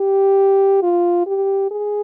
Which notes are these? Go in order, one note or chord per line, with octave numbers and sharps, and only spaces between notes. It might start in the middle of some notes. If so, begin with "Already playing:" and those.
Already playing: G4
F4
G4
G#4